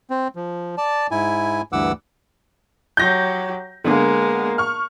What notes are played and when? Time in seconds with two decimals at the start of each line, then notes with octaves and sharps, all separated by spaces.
0.10 C4
0.36 F3
0.78 D5 A5
1.11 G#2 E4 G#5
1.73 D2 G2 E3 F#5 D6 E6
2.97 F#3 G4 G6 A#6
3.84 D3 G#3 A#3 B3
4.58 C#6 F6